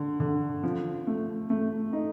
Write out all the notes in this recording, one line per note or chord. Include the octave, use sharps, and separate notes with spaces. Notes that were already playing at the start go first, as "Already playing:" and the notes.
Already playing: D3
D3
F3
A3
A3
D#4